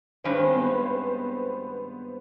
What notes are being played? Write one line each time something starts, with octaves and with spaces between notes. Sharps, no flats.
G2 D#3 G#3 C#4 C5
B4
C4 C5
B3 B4
C4 C5